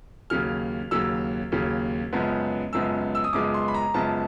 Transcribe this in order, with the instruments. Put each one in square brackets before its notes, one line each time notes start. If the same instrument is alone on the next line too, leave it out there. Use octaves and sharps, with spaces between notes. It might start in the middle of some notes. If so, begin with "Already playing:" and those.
[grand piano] D#2 C#3 F#3 F6
D#2 C#3 F#3 E6
D#2 C#3 F#3
F#2 C#3 F3 G#3 B3
F#2 C#3 F3 G#3 B3 E6
E6
D#6
F#2 C#3 F3 G#3 B3 D6
C6
B5
A#5
F#2 C#3 F3 G#3 B3 A5